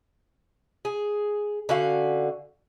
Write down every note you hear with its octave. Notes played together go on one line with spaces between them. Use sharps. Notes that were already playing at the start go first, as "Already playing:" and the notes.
G#4
D3 C#4 F#4 F5